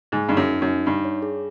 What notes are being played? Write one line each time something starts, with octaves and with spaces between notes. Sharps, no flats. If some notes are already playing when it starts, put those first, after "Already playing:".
G#2 G#4
G2 D#4
F#2
D#4
F#2
D#4
G2 D#4
C#5
G#4